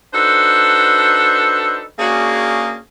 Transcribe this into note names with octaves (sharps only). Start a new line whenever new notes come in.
D4 D#4 F#4 A4 B4 C5
A#3 C#4 D4 F#4 G#4